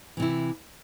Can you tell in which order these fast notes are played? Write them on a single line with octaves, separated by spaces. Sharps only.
E3 C3 E4